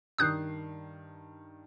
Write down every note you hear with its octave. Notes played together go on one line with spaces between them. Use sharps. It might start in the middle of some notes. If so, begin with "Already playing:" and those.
G2 D#3 D#6 F#6 G6 C7